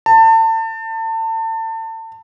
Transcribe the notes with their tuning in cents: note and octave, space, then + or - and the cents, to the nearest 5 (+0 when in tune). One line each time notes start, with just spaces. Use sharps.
A5 +30